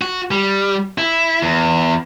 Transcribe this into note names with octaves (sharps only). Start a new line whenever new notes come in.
F#4
G3
E4
E2